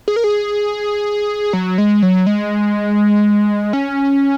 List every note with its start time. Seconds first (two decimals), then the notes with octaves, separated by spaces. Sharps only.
0.08 G#4
0.16 A#4
0.24 G#4
1.53 F#3
1.78 G#3
2.03 F#3
2.27 G#3
3.73 C#4